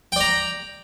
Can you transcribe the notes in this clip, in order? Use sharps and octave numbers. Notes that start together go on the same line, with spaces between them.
D5 G5 A#5